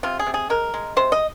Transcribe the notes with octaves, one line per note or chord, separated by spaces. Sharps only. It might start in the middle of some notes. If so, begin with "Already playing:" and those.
C3 F4
G#4
C3
G#4
G#3 A#4
G#3
C3 C5
D#5